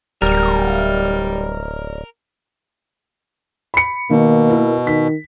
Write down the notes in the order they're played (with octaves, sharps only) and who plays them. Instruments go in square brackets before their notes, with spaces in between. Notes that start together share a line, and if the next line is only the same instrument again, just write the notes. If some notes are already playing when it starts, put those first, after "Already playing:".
[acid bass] D1 [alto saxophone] G3 [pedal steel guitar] A#4
[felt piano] B5 C#7
[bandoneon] B2 [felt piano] D#3 [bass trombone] A#3
[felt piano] E4 A#4
[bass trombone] D#3 [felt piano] B6